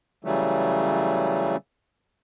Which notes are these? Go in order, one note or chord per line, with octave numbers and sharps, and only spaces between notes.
C#3 E3 F#3 G3 A3